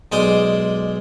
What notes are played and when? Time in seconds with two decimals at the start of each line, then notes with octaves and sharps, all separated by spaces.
0.12 B1 G#3 C5 D5 C6 D#6